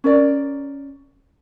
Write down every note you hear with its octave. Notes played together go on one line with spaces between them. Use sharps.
C#4 A#4 D5